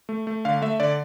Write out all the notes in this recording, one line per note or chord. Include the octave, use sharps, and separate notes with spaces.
A3
A3
D3 F5
A3 E5
D3 D5